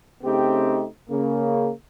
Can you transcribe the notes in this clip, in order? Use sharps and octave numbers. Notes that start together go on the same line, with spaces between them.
C#3 A3 C4 D#4 G4
C#3 A#3